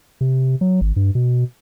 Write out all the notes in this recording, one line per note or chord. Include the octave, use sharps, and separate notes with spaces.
C3
F#3
G#1
G2
B2